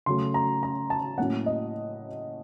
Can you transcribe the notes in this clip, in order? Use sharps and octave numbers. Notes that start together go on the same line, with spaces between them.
C#3 F#3 A3 C6
A#5
A#5
A5
A2 F#3 A#3 C#4 F#5
D#5